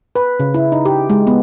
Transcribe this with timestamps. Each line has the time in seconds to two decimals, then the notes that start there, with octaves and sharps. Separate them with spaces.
0.16 B4
0.40 C#3
0.54 E4
0.72 D#4
0.85 G4
1.10 G#3
1.27 B3